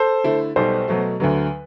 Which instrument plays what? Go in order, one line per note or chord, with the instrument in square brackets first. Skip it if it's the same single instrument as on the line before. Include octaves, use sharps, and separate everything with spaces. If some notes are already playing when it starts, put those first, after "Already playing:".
Already playing: [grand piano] A4 C5
[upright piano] D3 A3 E4
[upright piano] B1 B2 G3 [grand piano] A4 C5
[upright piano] B2 F#3 A3
[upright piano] D2 D3 F#3 [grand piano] B4